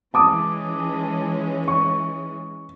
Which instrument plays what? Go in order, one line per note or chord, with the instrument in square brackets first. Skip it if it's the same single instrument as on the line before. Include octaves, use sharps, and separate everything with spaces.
[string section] E3 G#3 C#4 [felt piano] A5 D6 D#6
[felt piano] C#6